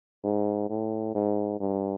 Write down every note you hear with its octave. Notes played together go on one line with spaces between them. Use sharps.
G#2
A2
G#2
G2